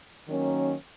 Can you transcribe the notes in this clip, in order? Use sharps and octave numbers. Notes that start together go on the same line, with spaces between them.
D#3 F#3 A#3 C#4